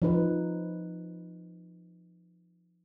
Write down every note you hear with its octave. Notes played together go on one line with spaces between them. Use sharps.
F3 D#4 B4